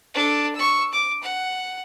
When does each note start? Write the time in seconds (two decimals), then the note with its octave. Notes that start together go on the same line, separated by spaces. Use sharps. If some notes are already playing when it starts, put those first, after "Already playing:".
0.14 D4 A4
0.55 C#6 E6
0.93 D6
1.23 F#5